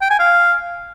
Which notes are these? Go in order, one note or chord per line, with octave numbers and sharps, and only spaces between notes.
G5
G#5
F5